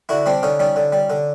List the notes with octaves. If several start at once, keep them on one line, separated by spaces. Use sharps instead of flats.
D3 E4 F#4
G3 C4 D4
D3 C#4 D#4
G3 C#4 D#4
D3
G3
D3